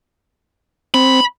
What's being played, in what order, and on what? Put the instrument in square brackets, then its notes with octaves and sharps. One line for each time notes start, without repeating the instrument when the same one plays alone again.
[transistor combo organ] C4 [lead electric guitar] B5